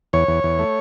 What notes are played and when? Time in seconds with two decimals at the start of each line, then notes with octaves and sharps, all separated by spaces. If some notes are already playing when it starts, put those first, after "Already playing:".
0.13 E2 C#5
0.28 E2
0.44 E2
0.59 A3